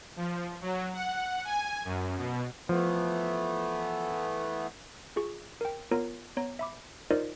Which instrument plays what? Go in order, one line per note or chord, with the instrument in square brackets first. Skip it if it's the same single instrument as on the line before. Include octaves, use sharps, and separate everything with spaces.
[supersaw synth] F3
F#3
F#5
G#5
F#2
B2
[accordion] E3 A3 B3 [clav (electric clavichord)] F3
[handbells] F4 G#4 C#6
A#4 G5
B3 F4 A#4 C#5 A#5
B3 C#5 A#5
E5 B5 D6
D#4 F4 A#4 C5 D5 D#5